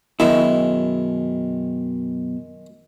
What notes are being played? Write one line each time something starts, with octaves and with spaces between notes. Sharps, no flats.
F#2 B2 D#3 G#3 E4